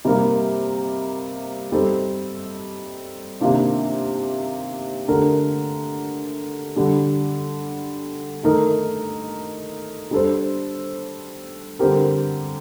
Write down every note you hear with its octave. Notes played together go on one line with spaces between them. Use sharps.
C3 G3 A#3 D#4 A#4
G3 C4 D#4 A4
C3 D#3 A#3 D4 F4
D3 A3 D4 G4 A#4
D3 G3 D4
D#3 A3 D#4 A#4
G3 D4 A4 C5
D3 G3 C4 G4 A#4